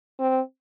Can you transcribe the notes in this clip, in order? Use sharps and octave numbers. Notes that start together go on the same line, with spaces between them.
C4